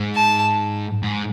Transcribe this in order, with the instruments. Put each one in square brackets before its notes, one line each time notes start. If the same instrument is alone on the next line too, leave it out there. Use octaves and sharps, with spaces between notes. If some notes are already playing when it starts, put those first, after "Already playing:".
Already playing: [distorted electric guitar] G#2
[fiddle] A5
[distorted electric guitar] G#2